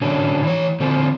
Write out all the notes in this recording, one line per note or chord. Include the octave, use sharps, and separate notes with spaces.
D3 F#3 C#4 D4
E3 C#5
D3 C4 F4 A4